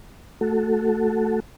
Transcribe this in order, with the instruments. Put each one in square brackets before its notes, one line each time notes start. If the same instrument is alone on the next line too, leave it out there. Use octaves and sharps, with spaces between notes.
[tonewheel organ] A3 F#4 A4